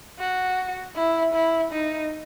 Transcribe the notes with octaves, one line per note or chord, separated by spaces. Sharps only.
F#4
E4
E4
D#4